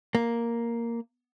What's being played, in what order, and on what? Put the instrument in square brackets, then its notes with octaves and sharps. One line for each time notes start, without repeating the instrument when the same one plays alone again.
[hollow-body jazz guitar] A#3